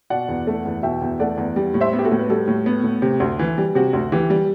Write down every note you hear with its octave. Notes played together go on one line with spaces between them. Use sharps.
B2 D5 F#5
E2
A3
E2
B2 E5 G5
E2
A3 D5 F#5
E2
G3
A2
C5 E5
B3
G4
F#4 A4
A2
B4
G3 F#4 A4
A2
B3
A2
C3
D2
E3
G3
C3 F#4
D2
E3 G4
G3